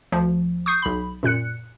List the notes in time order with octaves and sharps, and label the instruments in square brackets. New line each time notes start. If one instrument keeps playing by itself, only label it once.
[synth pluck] D2 F3
C#6 D#6 G6 C7
B1 B5
F#2 A#2 F#6 C#7